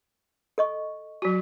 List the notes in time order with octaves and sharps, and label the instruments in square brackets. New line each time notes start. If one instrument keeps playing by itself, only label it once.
[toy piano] A4 D#5 C#6
[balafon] F#3 F#4